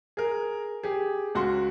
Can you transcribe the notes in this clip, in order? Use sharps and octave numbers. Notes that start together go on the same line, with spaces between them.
G#4 A#4
G4 G#4
C#2 F#4 C6